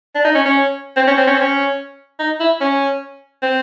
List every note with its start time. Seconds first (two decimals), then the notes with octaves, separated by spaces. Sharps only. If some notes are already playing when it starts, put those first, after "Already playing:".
0.15 D4
0.25 D#4
0.35 C#4
0.45 C#4
0.97 C4
1.07 C#4
1.18 C4
1.27 C#4
1.35 C4
1.42 C#4
2.19 D#4
2.40 E4
2.61 C#4
3.43 C4